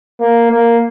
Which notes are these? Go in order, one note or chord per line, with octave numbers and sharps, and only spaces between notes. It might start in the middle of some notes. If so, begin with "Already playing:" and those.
A#3
A#3